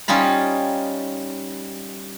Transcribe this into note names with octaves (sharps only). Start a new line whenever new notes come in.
G3 C#4 D#4 F4 B5